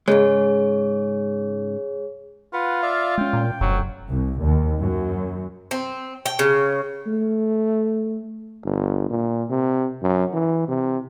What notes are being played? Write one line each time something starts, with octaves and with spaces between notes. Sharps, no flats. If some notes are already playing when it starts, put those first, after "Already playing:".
G#2 C#3 G#3 G#4 C#5
F4 B4 F#5
D5 E5 F5
G#3 C#4 G5
A#2
F1 F#2 F#3
C2
D#2
F#2
C4
G5
C#3
A3
G1
A#2
C3
F#2
E3
C3